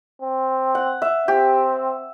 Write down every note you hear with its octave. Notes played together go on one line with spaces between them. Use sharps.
C4
F#5
E5
C4 G4